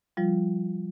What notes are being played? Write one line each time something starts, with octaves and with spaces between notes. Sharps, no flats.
F3 G3 F4